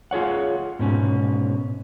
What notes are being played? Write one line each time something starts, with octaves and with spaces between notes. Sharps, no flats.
F4 G#4 C#5 F#5
G#2 B2 C#4